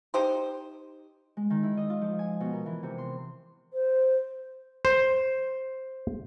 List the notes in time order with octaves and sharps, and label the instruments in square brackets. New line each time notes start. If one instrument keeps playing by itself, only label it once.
[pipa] D#4 G4 C5
[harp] G#3
D#3
E4
D#5
F4
F3
G#5
B2
A#4
E3
C3
C6
[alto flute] C5
[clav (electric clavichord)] C5